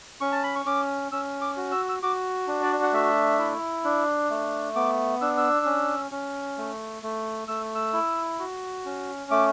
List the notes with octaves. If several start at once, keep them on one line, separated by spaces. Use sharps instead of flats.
C#4 C#6
A5
B5
C#6
C#4 D6
C#4 E6
D6
F#4
E6
E6
F#4 D6
D4
D5
F#5
A3 E5
E4
D4
A3
B3 D6
D4 E6
E6
C#4
C#4
A3
A3
A3 E6
E6
E4
F#4
C#4
A3 D6